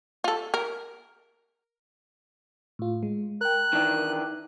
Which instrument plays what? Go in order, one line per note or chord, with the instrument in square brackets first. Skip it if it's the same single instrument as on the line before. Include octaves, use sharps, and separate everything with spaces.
[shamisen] F4 A4
A#4
[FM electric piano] A2 F4
G#3
[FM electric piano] A#4 G5 [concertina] F#6
[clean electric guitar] D#3 E3 D4